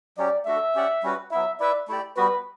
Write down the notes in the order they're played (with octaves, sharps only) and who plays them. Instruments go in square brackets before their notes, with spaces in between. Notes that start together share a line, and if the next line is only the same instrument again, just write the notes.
[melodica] F#3 C#4 G4 [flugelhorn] D5
[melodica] A3 D4 F#4 A4 [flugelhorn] E5
[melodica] C#4 G4 D5 F#5
G3 C#4 F#4 B4
[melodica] F#3 B3 E4 [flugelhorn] E5
[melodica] E4 B4 E5 [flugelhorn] D5
[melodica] A3 E4 G4 D5
[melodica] G3 B3 F#4 [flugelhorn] B4